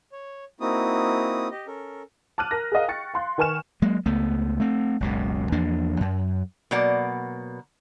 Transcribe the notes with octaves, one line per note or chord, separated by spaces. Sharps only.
C#5
A#3 C4 D#4 E4 F#4 D#6
G4 D#5
C#4 A4 A#4
A5 D6 F6 F#6 D#7
A#4 A#6
G#4 A#4 D#5 F5
G5 C#6 A6 C#7
F5 C6 F#6
D#3 B4 G#5 C#6 F6 E7
F#3 G#3 A#3
C#2 A3 B3
A3 C4
F#1 C#2 B2
E2 F3 A#3 D4
F#2
B2 F#3 A#3 D5 F#5